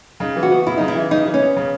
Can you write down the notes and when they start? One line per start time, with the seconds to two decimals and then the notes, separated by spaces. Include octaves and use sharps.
0.20 C#3 D#4
0.36 E3
0.43 F#4
0.51 B3
0.66 C#3 E4
0.77 D#4
0.81 C#3
0.88 E4
0.96 E3
1.11 C#3 D#4
1.26 E3
1.34 C#4
1.42 B3
1.56 C#3